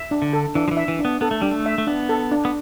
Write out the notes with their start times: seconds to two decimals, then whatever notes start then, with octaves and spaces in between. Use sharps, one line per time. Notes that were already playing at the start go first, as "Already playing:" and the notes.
Already playing: E5
0.11 D4
0.22 D3
0.33 A4
0.55 E3 D4
0.68 F3
0.71 E3
0.77 E5
0.88 E3
0.99 D4
1.05 B3
1.21 B3 A4
1.31 A3
1.42 G3 D4
1.51 A3
1.66 E5
1.78 A3
1.87 B3 D4
2.09 A4
2.31 D4
2.45 B3